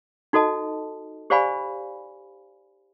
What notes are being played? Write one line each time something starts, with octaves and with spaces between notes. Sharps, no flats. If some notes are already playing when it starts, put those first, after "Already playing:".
D#4 F#4 A4 D#5 A5
G4 C5 D5 F5 G#5 B5